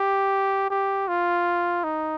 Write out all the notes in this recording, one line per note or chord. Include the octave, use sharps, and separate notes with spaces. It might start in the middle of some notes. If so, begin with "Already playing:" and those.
Already playing: G4
G4
F4
D#4